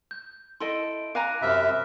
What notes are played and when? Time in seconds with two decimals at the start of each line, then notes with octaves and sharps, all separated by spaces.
0.11 G6
0.60 E4 A4 D#5 C6 D7
1.15 F5 G#5 A#5 D6 F#6 A#6
1.42 F#2 C3 E5 B5 F6